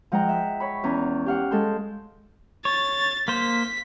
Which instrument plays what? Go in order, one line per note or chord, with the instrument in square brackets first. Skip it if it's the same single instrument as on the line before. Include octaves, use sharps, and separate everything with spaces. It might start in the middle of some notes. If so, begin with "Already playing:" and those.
[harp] F3 G#3 F#5 G5 A#5
E5
C#5 B5
E2 C#4 A#5
G4 F5 F#5
G#3 A4 C6 G6
[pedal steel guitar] C#5 [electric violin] A6
[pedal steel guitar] A#3 C5 [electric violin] B6